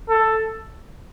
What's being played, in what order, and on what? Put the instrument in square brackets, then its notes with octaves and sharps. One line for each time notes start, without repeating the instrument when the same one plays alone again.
[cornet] A4